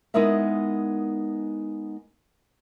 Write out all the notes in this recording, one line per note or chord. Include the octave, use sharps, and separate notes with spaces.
G#3 B3 D#4 E4 A#4 E5